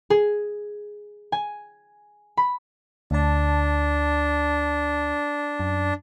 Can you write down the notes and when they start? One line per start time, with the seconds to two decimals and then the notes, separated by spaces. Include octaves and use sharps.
0.10 G#4
1.32 G#5
2.37 B5
3.11 D2 D4 A5
5.60 F#2